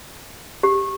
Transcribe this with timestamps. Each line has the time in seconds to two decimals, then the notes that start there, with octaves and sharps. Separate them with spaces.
0.63 G4